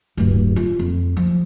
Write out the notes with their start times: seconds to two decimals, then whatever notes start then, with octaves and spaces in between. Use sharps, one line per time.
0.17 D1 G2
0.56 F4
0.79 F2
1.17 F3